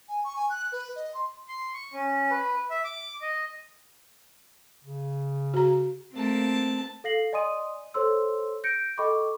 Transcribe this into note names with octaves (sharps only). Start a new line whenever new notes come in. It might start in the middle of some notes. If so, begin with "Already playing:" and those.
G#5
C#6
G#5
F#6
B4
D#5
C6
C6
C#6
C#4
B4
E5
D6
D#5
C#3
F#4 A#5
A3 A#3 C4 A5
A4 F5 A#6 C7 F#7
D5 D#5 G#5 C6 D#6 D#7
A4 C5 C#5 C6 E6
G6 A#6 C#7 D7
A4 D#5 G5 B5 C#6 D6